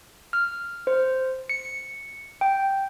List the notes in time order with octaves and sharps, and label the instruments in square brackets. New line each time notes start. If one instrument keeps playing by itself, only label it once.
[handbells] F6
C5
C#7
G5